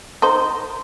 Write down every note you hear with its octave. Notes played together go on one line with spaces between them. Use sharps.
D#4 C5